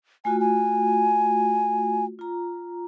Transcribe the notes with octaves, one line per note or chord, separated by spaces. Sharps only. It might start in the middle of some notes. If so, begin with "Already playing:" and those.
A3 F4 F#4 G#5
G#5
F4 A#5